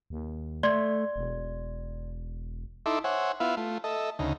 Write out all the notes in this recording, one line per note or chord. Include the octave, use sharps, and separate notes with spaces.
D#2
A3 D5 C6 G#6
E1
D#4 E4 A4 E5 C6 D6
C5 C#5 E5 F#5 G#5
B3 E4 F4 E5 F5
A3 F4
A4 D#5 E5
D2 C#3 D#4